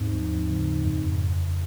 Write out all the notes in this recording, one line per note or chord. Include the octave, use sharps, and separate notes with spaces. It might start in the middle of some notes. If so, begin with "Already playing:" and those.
Already playing: D#2 G#2 C4
F3
C#3
F2